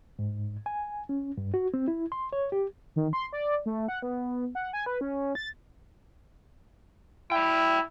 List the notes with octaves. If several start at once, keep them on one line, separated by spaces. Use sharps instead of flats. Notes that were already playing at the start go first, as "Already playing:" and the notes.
G#2
G#5
C#4
G2
F#4
C4
E4
C6
C#5
G4
D#3
C6
D5
A3
F#5
B3
F#5
G#5
B4
C#4
A6
E4 G5 B5